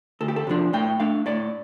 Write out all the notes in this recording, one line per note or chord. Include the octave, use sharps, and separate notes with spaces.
D2 A4
G4
A4
C3 F3 D4
A2 G5
A3 D4 F5
A2 D5